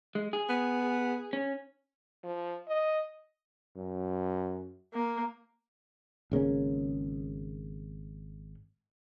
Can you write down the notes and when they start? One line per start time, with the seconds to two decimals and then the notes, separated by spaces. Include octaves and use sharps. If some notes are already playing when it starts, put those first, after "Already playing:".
0.15 G#3
0.33 G#4
0.49 B3
1.33 C#4
2.23 F3
2.68 D#5
3.76 F#2
4.94 A#3
6.32 G#1 C#3 A#3 C#4